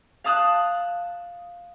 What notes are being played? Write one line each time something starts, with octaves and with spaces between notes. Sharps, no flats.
F5 A5 D#6 E6 F#6